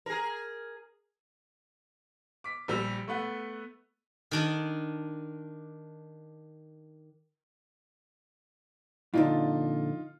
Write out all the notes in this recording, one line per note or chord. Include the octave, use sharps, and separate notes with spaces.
G#4 A#4
D6 B6
A#1 G3 E6
A3 B3 F#5
D#3 D4 D#5
F2 A#2 D3 D#4 F4